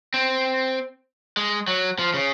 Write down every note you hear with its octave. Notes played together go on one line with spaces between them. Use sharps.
C4
G#3
F#3
F3
C#3